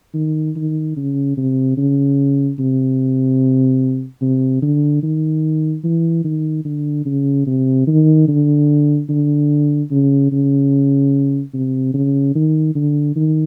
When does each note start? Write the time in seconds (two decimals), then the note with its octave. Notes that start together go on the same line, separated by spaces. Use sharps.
0.14 D#3
0.56 D#3
0.96 C#3
1.37 C3
1.77 C#3
2.59 C3
4.21 C3
4.62 D3
5.03 D#3
5.84 E3
6.24 D#3
6.65 D3
7.05 C#3
7.46 C3
7.87 D#3
8.28 D3
9.09 D3
9.91 C#3
10.32 C#3
11.53 C3
11.94 C#3
12.35 D#3
12.75 D3
13.16 D#3